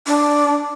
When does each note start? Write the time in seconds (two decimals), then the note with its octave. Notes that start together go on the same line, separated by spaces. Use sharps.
0.07 D4